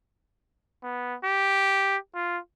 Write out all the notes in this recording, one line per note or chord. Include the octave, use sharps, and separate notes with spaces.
B3
G4
F4